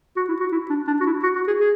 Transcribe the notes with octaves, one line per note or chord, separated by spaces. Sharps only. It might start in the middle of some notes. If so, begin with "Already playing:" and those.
F#4
E4
F#4
E4
D4
D4
F#4
E4
F#4
F#4
G#4
G#4